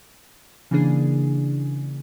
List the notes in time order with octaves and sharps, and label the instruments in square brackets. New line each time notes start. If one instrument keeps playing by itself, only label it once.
[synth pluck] C#3 E3 A#3 D4 G#4